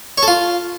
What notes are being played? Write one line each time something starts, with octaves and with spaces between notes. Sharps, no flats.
C#5
A4
F4